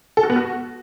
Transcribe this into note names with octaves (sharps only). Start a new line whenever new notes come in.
A4
F#4
B3
F#4